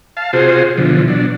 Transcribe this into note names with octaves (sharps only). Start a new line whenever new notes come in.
F5 A5
C3 F4 F#4 G#4 C5
B2 D3 E3 F3
B2 F#3 D4